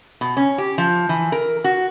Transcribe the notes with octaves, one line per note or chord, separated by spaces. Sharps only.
B2
C#4
G4
F3
E3
A#4
F#4